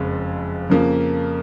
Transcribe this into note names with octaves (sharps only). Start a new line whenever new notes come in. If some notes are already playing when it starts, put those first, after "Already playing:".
Already playing: F#1 F2 F3 G#3
F2 C#3 F3 A#3